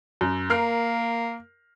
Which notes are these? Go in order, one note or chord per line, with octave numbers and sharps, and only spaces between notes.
F#2
A#3 A#4 F6 C7